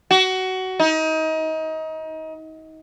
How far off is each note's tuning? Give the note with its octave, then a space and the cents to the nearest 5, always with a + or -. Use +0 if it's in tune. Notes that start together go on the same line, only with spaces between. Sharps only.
F#4 +20
D#4 +30